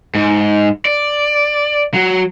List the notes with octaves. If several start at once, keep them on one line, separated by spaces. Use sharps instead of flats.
G#2
D5
F#3